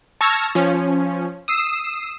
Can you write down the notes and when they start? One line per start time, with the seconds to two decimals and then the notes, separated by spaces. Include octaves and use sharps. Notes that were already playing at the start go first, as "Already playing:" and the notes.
0.21 A5 C#6 E6 F6 G#6 A#6
0.55 F3 C#4
1.48 D#6 E6 C7 E7